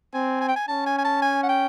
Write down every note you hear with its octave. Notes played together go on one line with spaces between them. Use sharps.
C4 G#5
G#5
G5
G#5
C#4 A5
G#5
G#5
A5
G#5
F#5
G5